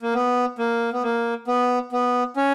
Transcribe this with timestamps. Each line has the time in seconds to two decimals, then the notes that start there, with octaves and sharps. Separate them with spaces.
0.02 A#3
0.14 B3
0.59 A#3
0.93 B3
1.03 A#3
1.48 B3
1.92 B3
2.37 C#4